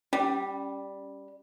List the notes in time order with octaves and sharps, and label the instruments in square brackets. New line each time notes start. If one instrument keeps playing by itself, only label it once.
[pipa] G3 [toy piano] C#4